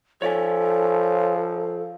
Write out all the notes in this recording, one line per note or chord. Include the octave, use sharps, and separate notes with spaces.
F3 A4 C#5 D5 G#5